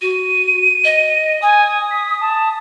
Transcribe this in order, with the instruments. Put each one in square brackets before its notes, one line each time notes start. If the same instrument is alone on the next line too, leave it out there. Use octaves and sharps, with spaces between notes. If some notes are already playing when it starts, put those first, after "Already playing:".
[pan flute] F#4 [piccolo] D#7
[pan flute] D#5
[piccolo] G#5 [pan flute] D#6
[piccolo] B6
A5